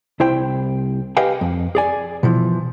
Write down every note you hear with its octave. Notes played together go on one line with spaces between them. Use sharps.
C2 E4 C5 G5
G4 B4 D#5 F5 G5 G#5
F2
G#4 D5 G#5
B2 E3 F3